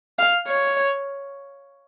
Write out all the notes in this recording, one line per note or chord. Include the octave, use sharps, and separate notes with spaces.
F5
C#5